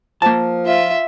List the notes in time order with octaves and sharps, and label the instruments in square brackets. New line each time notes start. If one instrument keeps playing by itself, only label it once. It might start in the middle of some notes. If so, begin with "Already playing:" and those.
[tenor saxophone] F3 [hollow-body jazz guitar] A#3 A5
[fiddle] F4 E5